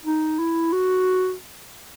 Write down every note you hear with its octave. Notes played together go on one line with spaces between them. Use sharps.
D#4
E4
F#4